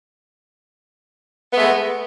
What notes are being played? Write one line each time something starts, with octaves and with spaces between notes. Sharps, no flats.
G#3 A3 B3